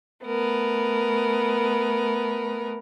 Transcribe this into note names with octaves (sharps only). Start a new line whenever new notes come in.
A3 B3 A#4